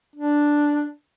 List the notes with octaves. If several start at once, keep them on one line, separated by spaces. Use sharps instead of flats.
D4